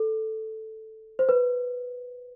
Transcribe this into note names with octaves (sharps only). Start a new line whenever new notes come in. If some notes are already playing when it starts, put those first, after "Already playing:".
Already playing: A4
C5
B4